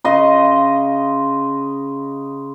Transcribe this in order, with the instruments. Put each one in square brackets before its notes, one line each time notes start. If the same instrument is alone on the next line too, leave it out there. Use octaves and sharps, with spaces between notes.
[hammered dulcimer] C#3 D#5 C6